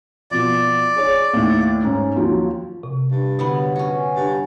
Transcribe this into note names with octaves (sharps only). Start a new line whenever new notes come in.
B2 F3 D5
G#4 C#5
D#2 A2
G#2 C#4
D#2 F3 F#3
C3
G2
D3 F#3 B3 B4 B5
C#4 F#4
G2